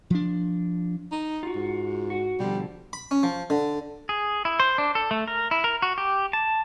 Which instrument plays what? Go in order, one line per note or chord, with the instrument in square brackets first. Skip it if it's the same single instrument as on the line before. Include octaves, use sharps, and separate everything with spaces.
[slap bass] F3 D4
[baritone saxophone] D#4
[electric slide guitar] F4 F#4
[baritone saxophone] G#2
[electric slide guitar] F#4
[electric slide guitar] B2 D3 F3 [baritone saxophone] G3
[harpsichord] B5
C#4
F3
D3
[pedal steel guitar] G#4
E4
C5
D4
A4
A3
A#4
E4
A#4
F#4
G4
A5